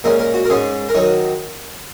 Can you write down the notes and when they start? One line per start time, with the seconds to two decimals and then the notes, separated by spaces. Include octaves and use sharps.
0.04 A#2 G#3 C#4 A#4
0.19 A#4
0.34 F#4
0.45 A#4
0.50 G#2 G#3 C#4 G#4
0.89 A#4
0.95 D#3 F#3 D#4 C#5